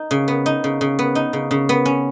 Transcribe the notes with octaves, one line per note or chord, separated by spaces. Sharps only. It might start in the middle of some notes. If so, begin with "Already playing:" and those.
Already playing: D#4
C#3
B3
D#4
C#3
C#3
B3
D#4
C#3
C#3
B3
C#4